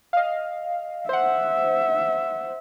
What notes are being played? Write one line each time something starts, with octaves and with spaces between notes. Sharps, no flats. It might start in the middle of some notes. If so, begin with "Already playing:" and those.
D#5 F5
C5 E5 F#5